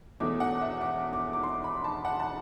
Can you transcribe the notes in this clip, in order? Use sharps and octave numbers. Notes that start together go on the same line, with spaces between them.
E1 E2 B2 A3 D6
F#5
E5
D6
D6
D6
C6
B5
A5
F#5
A5